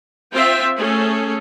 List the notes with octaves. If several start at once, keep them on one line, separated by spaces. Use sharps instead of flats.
C4 F4 C5 E5 G5
A3 C#4 G#4 A4